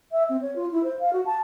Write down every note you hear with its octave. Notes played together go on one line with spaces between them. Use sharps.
E5
C4
C#5
F4
E4
C5
F5
F#4
A5